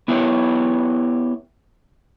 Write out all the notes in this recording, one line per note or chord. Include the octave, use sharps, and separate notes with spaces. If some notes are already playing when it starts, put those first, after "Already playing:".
B3 E4 G4 B4 C#5